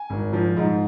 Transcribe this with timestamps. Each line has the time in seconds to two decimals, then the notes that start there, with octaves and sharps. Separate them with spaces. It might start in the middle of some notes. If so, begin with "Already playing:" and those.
Already playing: G#5
0.10 G#1
0.33 F3
0.57 G#2